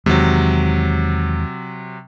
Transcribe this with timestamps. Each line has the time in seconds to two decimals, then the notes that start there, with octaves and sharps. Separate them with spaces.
0.06 E2 C3 D#3 F#3 G#3